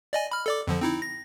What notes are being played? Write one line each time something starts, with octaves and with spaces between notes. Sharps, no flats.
D5 D#5 G#5
B5 F6
A4 D5 D6
F2 D3 F3
C4 D#4 E4
A#6